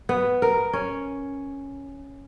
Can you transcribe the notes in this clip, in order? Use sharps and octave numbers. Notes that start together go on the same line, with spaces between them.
B3
A#4
C#4